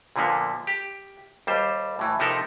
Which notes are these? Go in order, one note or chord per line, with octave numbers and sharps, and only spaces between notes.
A#2 D3 F3 A#3 B3
G4
D#2 G3 C5
A2 E3
C3 F3 B3 D#4 A4 A#4